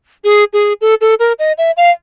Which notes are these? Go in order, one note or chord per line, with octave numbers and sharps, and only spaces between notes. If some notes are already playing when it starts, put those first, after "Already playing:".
G#4
G#4
A4
A4
A#4
D#5
E5
F5